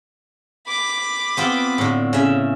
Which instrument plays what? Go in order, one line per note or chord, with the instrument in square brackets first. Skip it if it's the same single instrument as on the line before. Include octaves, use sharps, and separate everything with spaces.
[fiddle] B5 D6
[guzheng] B3 C4 F4
A2 D3
C#3 E5